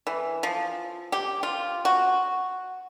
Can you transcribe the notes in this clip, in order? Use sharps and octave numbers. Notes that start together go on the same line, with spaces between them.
E3
F3
G4
F4
F#4